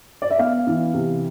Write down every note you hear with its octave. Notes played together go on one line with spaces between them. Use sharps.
D5
E5
B3 F5
E3
C3